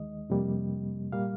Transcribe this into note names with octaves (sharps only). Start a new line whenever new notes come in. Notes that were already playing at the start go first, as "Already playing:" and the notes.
Already playing: D#2 D#3 G#3 D#5
F2 C3 G3 A#3
A#2 G3 A#3 F5